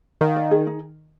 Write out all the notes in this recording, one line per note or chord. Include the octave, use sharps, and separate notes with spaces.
D#3 F5
D5
G#4
D#4